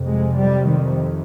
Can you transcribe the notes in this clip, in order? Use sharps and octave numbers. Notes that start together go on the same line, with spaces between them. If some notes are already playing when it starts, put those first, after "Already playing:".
Already playing: F2 C3
G#3
G3
D#3